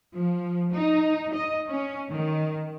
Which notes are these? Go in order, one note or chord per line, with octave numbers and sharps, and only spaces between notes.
F3
D#4
D#5
C#4
D#3